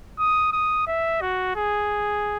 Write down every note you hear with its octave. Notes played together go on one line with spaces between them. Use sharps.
D#6
D#6
E5
F#4
G#4